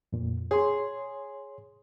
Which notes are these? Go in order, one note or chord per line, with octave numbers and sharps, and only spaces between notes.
F2 A#2
G#4 C#5 C6